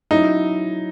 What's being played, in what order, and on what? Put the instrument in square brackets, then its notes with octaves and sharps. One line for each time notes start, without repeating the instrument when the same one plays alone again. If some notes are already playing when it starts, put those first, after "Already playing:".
[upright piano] F#3 C#4 E4 [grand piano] D#4